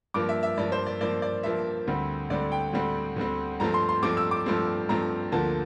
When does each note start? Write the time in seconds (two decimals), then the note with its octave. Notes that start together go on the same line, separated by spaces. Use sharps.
0.14 G2 F3 A#3 D6
0.29 E5
0.43 E5
0.58 G2 F3 A#3 D5
0.72 C5
0.86 D5
1.01 G2 F3 A#3 D5
1.22 D5
1.43 G2 F3 A#3 E5
1.87 D2 D3 G3 C4
2.30 D2 D3 G3 C4 D5
2.52 G5
2.73 D2 D3 G3 C4
3.16 D2 D3 G3 C4
3.60 G2 F3 A3 C4 A#5
3.74 C6
3.89 C6
4.03 G2 F3 A3 C4 D6
4.17 E6
4.31 D6
4.46 G2 F3 A3 C4
4.89 G2 F3 A3 C4 A#5
5.32 D2 D3 F3 A#3 A5